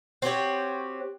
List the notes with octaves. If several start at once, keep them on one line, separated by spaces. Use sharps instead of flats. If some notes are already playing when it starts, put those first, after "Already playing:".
C4 F#4 G4 C#5